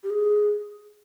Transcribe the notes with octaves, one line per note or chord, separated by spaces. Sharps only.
G4
G#4